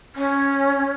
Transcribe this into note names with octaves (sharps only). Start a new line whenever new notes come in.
C#4